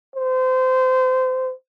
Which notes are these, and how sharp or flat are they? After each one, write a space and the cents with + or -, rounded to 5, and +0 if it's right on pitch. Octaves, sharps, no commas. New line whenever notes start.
C5 -25